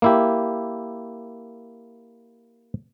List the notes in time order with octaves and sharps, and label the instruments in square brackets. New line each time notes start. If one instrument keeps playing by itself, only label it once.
[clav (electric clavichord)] A#3 E4 G4